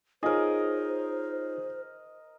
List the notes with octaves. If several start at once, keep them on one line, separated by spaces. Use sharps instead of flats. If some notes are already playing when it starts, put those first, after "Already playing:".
D#4 F4 G#4 A#4 C5 C#5 D#5